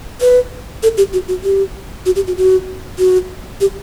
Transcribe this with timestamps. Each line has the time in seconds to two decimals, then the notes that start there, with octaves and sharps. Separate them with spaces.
0.21 B4
0.83 A4
0.98 G4
1.13 F#4
1.28 F#4
1.44 G4
2.06 F#4
2.16 G4
2.27 F#4
2.37 F#4
2.99 F#4
3.61 G4